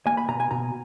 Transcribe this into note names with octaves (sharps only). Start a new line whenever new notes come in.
A#3 G#5
B5
B2 A#5
G#5
B2 A#5